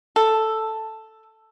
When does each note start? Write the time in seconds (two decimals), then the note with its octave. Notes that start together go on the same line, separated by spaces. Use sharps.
0.16 A4